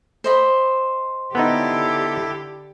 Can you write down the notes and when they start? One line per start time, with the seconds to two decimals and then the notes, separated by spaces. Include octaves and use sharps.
0.24 C5 D#5 B5
1.35 D3 B3 D#4 E4 G4 A4